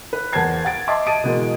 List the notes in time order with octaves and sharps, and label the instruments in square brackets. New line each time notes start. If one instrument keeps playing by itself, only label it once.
[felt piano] B4
E2 A#3 C5 A5 G#6 C7
F#5 A6 D7
D#5 E5 A5 C6 D6 D#6
D#5 A5 D#6 D7 D#7
B2 E3 G#3 A#3